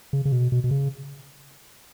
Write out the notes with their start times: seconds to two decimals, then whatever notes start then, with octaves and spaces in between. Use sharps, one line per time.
0.13 C#3
0.25 C#3
0.32 B2
0.52 B2
0.64 B2
0.71 C#3